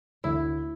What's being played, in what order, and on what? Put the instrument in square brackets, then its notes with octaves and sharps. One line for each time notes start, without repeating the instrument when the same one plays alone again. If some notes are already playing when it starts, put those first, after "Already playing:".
[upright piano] D2 [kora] E4